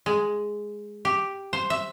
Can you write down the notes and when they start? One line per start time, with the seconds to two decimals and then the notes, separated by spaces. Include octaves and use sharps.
0.06 G#3
1.05 G4
1.53 C5
1.70 E5